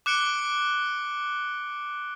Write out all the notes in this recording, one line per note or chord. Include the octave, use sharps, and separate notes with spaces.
D6 F#6 C#7 D7 G7